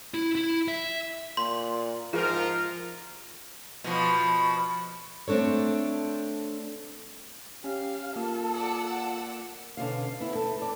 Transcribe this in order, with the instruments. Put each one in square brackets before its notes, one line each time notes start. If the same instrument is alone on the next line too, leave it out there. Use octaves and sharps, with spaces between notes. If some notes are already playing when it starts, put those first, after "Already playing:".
[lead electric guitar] E4
E4
E5
[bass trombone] A#2 [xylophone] C6
[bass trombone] G#2 [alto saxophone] F3 [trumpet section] F4 A#4 [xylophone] G#4
[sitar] B2 F3
[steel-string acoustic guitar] A3 C4 D4 A4 C#5
[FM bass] C#4 [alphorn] G4 [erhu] F5
[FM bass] A#3 [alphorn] F4 [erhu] A4
[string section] D5 F#5 E6
[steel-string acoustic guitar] B2 D3 C#4 F5
B3 E4
A4 B4
A4 D5